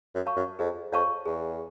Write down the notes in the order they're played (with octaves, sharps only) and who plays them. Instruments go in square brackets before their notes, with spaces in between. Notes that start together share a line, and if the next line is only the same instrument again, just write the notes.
[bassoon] F#2
[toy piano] C#5 F5 A5 C#6
[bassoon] F#2
[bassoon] F2 [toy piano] G#4
[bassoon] F2 [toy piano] C#5 F5 A5 C#6
[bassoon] E2 [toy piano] G#4